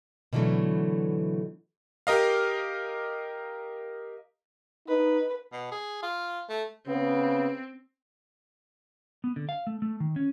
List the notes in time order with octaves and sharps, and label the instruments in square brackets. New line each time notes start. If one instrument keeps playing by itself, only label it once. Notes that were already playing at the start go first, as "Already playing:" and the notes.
[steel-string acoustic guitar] B2 D3 E3 F#3 A3
[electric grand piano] G4 A#4 D#5 F5
[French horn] D#4 [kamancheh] B4
[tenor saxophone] B2
G#4
F4
A3
[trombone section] C#3 B3 [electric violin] C4
[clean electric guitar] B3
D3
F5
A3
A3
D#3
C#4